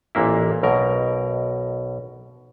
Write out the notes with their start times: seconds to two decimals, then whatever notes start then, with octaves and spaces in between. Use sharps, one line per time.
0.15 A1 A#2 A#3 E4
0.63 B1 B2 A#4